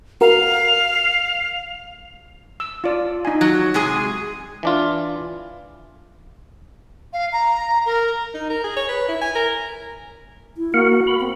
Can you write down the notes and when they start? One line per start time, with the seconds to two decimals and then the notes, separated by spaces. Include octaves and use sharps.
0.21 F#4 A#4 F5
2.60 E6
2.84 F4 D5
3.25 D#4 G#5
3.41 F#3
3.74 C3 G#3 G#4
4.63 E3 D4 F4
7.13 F5
7.33 A#5
7.86 A#4
8.34 D#4
8.50 A#4
8.64 G#4
8.77 C#5
8.89 B4
9.09 E4
9.21 G#5
9.36 A#4
10.57 E4
10.74 A#3 F#4 A#4 F#5
11.07 B5
11.20 C4